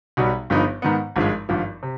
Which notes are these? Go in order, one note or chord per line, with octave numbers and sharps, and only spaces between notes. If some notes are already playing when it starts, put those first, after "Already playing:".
B1 B2 G3 B3
G1 G2 F3 B3 D#4
G#2 D#3 B3
G#1 G2 F3 G#3
G#1 G2 F3
C3